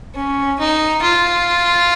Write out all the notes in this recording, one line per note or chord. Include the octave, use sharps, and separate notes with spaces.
C#4
D#4
F4